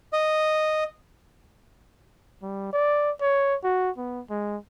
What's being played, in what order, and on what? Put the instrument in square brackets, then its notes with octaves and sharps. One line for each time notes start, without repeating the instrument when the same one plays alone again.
[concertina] D#5
[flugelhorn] G3
D5
C#5
F#4
B3
G#3